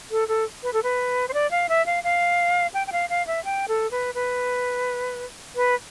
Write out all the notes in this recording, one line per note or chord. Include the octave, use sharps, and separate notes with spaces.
A4
A4
B4
A4
B4
C5
D5
F5
E5
F5
F5
G5
G5
F5
F5
E5
G5
A4
B4
B4
B4